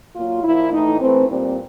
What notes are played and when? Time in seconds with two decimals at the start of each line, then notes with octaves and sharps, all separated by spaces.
0.16 A#2 F#3 A#3 F4
0.44 A#2 F3 A#3 E4
0.73 A2 E3 A3 D#4
1.01 E3 A3 C4
1.28 A#2 G3 C4